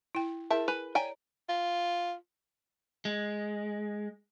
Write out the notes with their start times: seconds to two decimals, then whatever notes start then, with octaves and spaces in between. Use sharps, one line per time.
0.15 E4 G5
0.50 E4 G#4 A#4 E5 A5
0.68 B4 G#5
0.95 C#5 D5 G5 G#5 A#5
1.49 F4
3.05 G#3